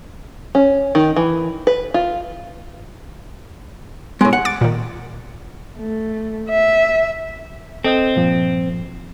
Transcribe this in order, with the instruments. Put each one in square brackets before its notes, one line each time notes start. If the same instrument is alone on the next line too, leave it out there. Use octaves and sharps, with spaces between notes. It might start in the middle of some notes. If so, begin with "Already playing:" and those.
[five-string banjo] C#4
D#3
E3
B4
F4
[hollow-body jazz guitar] A2 G#3 [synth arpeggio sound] B3
[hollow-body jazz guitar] F#5
[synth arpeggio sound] D6 A6 D7
A#2 D#3
[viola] A3
E5
[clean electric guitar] C4 [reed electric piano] A4 D#5 G6
[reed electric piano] G2 A#2 F3